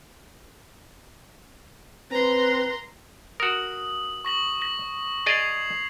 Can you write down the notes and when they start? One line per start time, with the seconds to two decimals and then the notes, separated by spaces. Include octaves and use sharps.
2.11 C4 B4 A#5 C6
3.40 F#4 A#4 D#6 F#7
4.25 C#6 A#6 F#7
4.62 A#6 F#7
5.26 G#4 D5 D#5 G#6 C7 F7